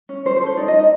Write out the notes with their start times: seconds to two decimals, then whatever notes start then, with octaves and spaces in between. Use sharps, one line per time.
0.09 C#4
0.25 C#4 C5
0.36 C5
0.41 A4
0.46 C5
0.57 D#4 D5
0.68 D#5
0.74 D#4
0.79 D#5